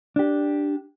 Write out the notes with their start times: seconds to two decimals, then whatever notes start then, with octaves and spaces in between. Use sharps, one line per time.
0.16 D4 G4